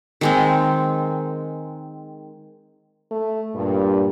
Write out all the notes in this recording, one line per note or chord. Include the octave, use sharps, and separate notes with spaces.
D#3 G#3 C4
A3
G2 A#2